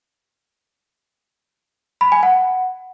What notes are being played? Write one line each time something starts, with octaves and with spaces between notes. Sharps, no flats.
B5
G#5
F#5